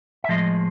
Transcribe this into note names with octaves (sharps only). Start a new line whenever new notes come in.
E5
A2 F3 G#3 D#5